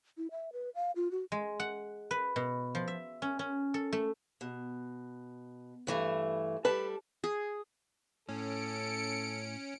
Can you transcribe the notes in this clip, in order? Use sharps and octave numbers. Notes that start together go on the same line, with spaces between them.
E4
E5
B4
F5
F4
F#4
G#3
F#5
B4
B2
F3
E5
C#4
C#4
A4
A3
B2
G2 E3 A3
G3 A4 B4 A5
G#4
A2 C#4 A4 C#7 D7